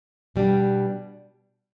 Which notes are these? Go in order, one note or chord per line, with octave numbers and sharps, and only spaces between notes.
B2 G3 D4